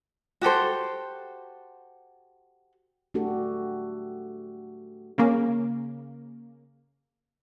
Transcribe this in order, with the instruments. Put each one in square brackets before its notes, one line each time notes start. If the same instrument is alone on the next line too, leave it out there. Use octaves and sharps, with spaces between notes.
[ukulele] F#4 G4 A4 C5
[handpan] A3 D4 F#4 G4 A4
[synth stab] C#3 A#3